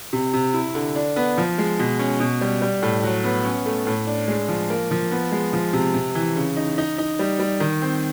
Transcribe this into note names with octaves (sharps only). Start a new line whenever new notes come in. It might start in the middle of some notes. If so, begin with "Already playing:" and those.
C3
C3
E4
D3
D4
B3
F3
G#3
B2
C#4
B2
G3
G3
A2
F#3
B3
C#4
A3
A2
D4
G#3
F3
A#3
F3
B3
G#3
F3
C3
C3
E3
C#3
D#4
D#4
D#4
G3
G3
D#3
C4